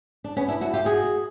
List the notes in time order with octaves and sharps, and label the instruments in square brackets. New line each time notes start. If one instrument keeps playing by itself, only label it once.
[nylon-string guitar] D4
B3 C#4
D4 E4
E4 F#4
F4 G4
F#4 G#4